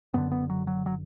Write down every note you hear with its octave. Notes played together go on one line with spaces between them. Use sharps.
F#1 F#2 D3 B3
B3
F#3
F#3
F#3